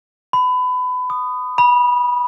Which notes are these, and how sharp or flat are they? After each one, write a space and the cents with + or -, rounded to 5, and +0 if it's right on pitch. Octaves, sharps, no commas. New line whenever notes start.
B5 +25
D#6 -15
B5 -20